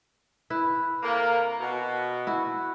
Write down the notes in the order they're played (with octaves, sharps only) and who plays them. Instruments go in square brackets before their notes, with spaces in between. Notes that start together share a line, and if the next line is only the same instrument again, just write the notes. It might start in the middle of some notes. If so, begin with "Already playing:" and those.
[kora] E4 B4
[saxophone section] C3 A3 A#3
B2
[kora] E4 F#4